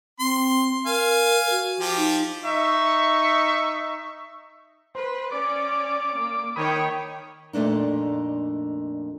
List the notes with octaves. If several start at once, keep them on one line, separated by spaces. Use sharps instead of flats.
C4 C6
A#4 F5 G#5
F#4
F3 G4
D#4
D#4 E5 C#6
B4 C5
C#4 D5 D6
A#3
D#3 C#5 G5 B5 D#6
F2 A#2 A3 D4 D#4